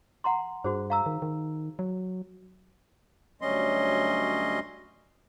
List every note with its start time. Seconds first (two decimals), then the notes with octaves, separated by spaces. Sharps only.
0.24 F#5 A#5 C6
0.64 G2 F#4 G#4 C5
0.90 F5 A#5 E6
1.06 D#3
1.22 D#3
1.79 F#3
3.42 D2 F#3 G3 C#4 D#5 C6